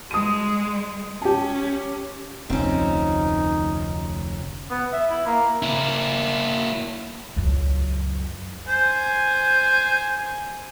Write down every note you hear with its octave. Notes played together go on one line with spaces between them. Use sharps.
G#3 D#6 D#7
C#4 G4 A5
F1 D2 C4 C#4 D#4
B3
E5
E4
A#3
A#3 E4
C#2 F#2
C5 G#5